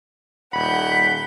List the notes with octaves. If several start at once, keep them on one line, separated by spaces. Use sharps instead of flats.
D#1 F#5 B5 G6
B6